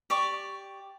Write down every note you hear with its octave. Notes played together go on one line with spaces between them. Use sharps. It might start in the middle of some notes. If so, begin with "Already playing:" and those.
G4 D5 C#6